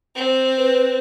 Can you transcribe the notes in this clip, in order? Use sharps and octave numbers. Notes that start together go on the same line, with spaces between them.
C4
B4